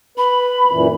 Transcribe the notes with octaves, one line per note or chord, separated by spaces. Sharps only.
B4 B5
F#2 A#2 E3